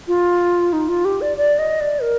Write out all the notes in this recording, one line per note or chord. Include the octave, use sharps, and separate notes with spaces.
F4
D#4
F4
G4
D5
D5
D#5
D5
A#4